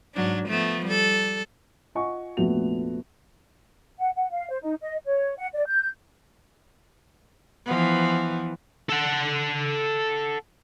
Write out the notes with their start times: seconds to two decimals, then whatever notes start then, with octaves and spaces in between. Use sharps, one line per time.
0.14 G#2 F#3 D4
0.47 F3 A3 B3
0.86 G3 A4
1.95 F4 D#5 F#5 G#5 C#6
2.37 F1 A#1 A3 B3 F#4 F7
3.99 F#5
4.16 F#5
4.31 F5
4.50 C5
4.62 D#4
4.81 D#5
5.06 C#5
5.38 F#5
5.54 D5
5.67 G6
7.66 E3 F3 B3
8.89 A4 F#5